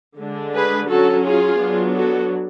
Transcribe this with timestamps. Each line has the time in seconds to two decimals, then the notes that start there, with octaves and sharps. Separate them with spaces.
0.18 D3 G#3 D4
0.53 G#4 B4
0.88 F#3 C#4 F#4 A4
1.24 F4 G#4
1.60 F#3 B3 D4
1.95 F#4 A4